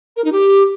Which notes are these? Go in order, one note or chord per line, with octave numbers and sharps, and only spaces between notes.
A#4
D#4
G4